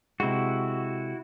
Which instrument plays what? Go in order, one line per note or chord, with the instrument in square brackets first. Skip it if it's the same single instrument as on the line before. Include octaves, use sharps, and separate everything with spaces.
[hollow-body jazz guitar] C3 G#3 [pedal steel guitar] E4 F#4